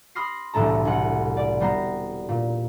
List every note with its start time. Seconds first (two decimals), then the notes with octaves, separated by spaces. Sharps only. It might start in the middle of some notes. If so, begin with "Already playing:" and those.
0.15 B5 C6 D#6 F6 A#6 C7
0.54 E1 C2 A2 A3 A4 A#5
0.85 C2 F#5 C#7
1.37 D5
1.60 G3 B3 C5 A#5 A#6
2.29 A#2